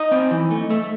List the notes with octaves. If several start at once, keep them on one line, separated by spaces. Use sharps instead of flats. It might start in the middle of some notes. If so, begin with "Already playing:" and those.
Already playing: D#4 D#5
C4
E3
A3
A3